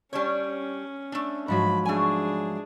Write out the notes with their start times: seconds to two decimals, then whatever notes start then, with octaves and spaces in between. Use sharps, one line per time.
0.13 G3 C#4 D4 C#5
1.12 A3 D4
1.48 G#2 F3 F#3 B5
1.86 A3 D4 G#4 G#5